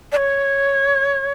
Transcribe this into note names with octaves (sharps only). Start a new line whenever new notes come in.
D5
C#5